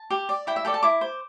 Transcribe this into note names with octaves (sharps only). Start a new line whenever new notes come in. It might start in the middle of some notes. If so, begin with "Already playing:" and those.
Already playing: A5
G4
D5
E4 G5
E5
A4 D5 G5
A5
E4 D6
C5